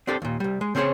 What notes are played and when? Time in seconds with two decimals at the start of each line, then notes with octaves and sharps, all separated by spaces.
0.07 C4 D4 G4 A4 C5
0.22 D#2 A#2
0.40 C2 G3
0.61 G#3
0.75 C#3 C4 C#4 G#4 C5 C#5